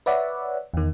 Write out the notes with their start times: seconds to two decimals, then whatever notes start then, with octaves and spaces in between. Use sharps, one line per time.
0.06 B4 C#5 D5 E5 F#5
0.74 E2 D#3